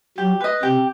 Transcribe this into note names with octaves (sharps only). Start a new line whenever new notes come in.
F#3 G4
B4 D#5
C3 G4